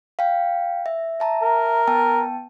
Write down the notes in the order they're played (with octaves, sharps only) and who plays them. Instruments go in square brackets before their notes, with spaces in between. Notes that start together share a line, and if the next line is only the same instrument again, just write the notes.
[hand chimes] F5 G5
E5
E5 A5 A#5
[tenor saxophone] A#4
[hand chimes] B3 G5 A5